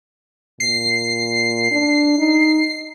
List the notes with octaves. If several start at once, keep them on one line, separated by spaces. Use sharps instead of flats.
A#2 C7
D4
D#4